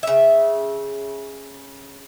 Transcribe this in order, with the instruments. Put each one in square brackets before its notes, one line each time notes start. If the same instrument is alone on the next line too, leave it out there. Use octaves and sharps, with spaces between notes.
[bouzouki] C#3 E5